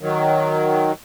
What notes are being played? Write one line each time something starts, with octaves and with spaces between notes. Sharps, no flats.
D#3 F#3